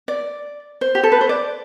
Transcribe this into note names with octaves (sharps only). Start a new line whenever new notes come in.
D5
C5
G4
A4
B4
C5
D5